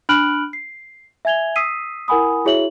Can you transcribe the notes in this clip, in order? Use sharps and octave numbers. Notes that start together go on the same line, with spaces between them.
D4 B5 F6 F#6 D7 F#7
C7
E5 G#5 G#6 F7 G7
D#6 E6 B6 C7 D#7
E4 A#4 F#5 G#5 B5 D#6
E4 F#4 G#4 C#5 E5 F#7